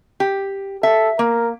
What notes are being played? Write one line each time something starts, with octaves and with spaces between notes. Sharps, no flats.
G4
A4 E5
A#3 A#4